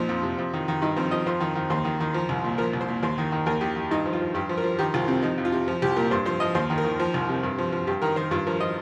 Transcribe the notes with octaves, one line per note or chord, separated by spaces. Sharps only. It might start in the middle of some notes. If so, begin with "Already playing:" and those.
Already playing: A#2 F3 D#4
F2
C3
F2
D#3
D#3
G2 D#4
F3 C4
F3 D#5
F2 C5
D#3
D#3
D#2 C5
D#3
D#3
F3
C2
A#2
F3 A#4
C2
C5
A#2
D#2 C5
D#3
D#3
D#2 A#4
D#3 G4
D#3
G2 D#4
F3
F4
F3
G2 G4
F3
A#4
F3
D#3 G4
C2 F4
C3 C4
F3 D#4
F2
F4
C3
F3
C2 G4
A#2 A#4
G2 C5
F3 C5
F3 D#5
D#2 C5
D#3
A#4
D#3
F3
C2
C3
G2
F3
F3
G2 G4
D#3 A#4
D#3 C5
G2 F4
F3 A#4
F3 D#5